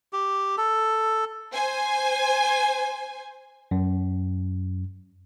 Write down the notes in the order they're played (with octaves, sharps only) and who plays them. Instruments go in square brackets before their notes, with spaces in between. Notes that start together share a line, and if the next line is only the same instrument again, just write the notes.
[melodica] G4
A4
[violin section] C5 G#5
[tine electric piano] F#2